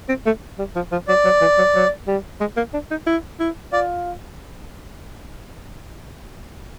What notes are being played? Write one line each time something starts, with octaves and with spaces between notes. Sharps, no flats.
C4
A3
G3
F3
F3
F#3 D5
F#3
E3
F#3
F#3
G3
G#3
A#3
D4
D#4
E4
E4
F4 D5